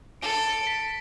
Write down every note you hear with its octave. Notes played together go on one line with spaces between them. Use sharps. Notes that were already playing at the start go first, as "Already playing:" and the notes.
A4 D7
D7
B6